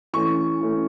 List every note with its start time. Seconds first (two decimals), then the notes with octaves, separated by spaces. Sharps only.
0.13 E3 A3 C#4 C#6
0.61 E3 A3 C#4